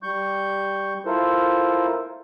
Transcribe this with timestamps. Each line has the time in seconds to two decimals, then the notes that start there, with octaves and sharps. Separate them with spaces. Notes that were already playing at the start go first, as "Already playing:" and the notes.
0.03 G3 C#6 G6
1.06 E4 F4 A4 A#4 C5